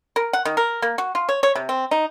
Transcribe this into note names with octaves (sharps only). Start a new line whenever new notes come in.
A#4
F#5
D#3
A#4
A#3
F#4
F4
C#5
C#5
C3
C4
D#4